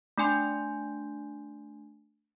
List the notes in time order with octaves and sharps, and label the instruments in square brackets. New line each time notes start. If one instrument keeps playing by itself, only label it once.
[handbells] A3 D4 G#5 C6 G6